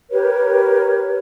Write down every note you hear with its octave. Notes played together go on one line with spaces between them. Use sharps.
G4 A#4 B4 C#5